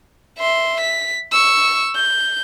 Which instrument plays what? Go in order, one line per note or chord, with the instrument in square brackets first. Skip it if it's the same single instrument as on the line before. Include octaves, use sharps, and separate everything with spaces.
[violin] E5 C6
B6
C#6 E6
G6